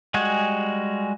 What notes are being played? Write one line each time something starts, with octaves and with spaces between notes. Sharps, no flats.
G3 G#3 F#4 G#4